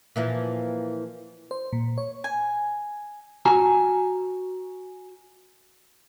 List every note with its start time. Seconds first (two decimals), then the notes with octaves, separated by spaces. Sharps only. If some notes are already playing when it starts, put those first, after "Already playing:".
0.16 A#2 E3 F3
1.51 C5
1.73 A#2
1.98 C#5
2.24 G#5
3.46 F#4 G#5 A#5